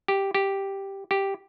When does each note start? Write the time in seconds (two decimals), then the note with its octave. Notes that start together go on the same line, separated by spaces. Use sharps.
0.08 G4
0.35 G4
1.11 G4